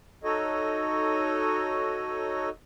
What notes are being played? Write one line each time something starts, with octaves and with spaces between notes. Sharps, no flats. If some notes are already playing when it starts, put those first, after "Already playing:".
D#4 F#4 A4 C#5 D#5